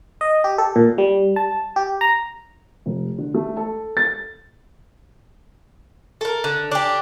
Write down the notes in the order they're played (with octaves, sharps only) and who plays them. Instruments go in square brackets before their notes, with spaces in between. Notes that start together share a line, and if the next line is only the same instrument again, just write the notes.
[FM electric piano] D#5
G4
A4
A#2
G3
A5
G4
A#5
[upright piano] F1
D3
A3
A4
A6
[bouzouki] A4 A#4
D3
D4 G4